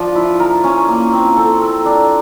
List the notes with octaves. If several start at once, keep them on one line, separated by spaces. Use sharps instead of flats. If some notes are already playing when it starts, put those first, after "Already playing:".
Already playing: F3 D4
E4
A#4
C#4
A#3
C4
A4
A#4
D4